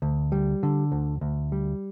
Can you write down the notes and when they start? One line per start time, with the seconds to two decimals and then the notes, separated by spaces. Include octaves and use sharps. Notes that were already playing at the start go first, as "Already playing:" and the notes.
0.02 D2
0.32 G3
0.63 D3
0.92 D2
1.21 D2
1.52 G3